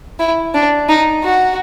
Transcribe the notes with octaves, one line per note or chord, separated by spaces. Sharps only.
E4
D4
D#4
F#4